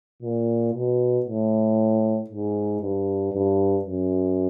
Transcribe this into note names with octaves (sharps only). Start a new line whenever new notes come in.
A#2
B2
A2
G#2
G2
G2
F#2